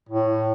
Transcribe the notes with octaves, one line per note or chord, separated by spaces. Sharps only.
A2